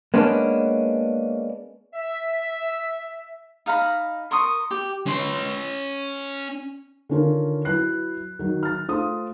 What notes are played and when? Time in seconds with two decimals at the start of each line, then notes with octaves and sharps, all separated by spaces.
0.14 G#3 A#3 B3 C#4 D4
1.94 E5
3.66 D#4 F5 A#5 B5
4.31 A#4 C6 C#6 D#6
4.71 G4
5.06 C#4 C6
7.09 D3 D#3 C#4 F4 A#4
7.65 F#3 E4 B4 F#6 C7
8.39 D#3 F#3
8.63 F6 A6
8.88 A3 F4 C5 D#6